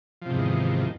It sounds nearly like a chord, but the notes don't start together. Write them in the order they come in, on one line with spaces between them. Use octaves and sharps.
F3 C3 G#2 E2 D#3